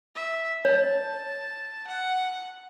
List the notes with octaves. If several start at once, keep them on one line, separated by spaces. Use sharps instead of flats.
E5
C#5 A5
F#5